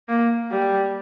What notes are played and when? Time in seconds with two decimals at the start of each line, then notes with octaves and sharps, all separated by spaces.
0.08 A#3
0.51 G3